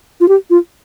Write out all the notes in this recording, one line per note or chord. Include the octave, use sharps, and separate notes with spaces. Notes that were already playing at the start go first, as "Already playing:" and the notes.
F4
G4
F4